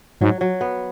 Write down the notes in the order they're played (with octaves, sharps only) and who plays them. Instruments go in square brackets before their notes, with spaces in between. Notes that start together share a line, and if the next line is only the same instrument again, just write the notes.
[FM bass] G#2 [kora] F#3
[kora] F#3
B3